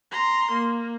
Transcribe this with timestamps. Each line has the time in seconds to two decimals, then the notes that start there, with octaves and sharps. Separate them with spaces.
0.11 A#5 C6
0.53 A#3